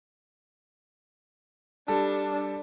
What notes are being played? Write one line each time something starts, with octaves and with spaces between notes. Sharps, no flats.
G3 D4 A4